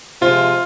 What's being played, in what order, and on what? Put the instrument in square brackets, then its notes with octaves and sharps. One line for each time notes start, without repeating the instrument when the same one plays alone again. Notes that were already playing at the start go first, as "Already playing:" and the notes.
[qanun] C3 F3 G#3 [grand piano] F4